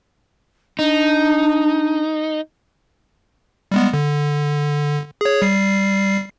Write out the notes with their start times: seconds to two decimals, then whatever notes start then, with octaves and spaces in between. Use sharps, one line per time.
0.79 D4 D#4
3.72 G3 G#3 B3
3.93 D3
5.21 G#4 C#5
5.42 G3 C7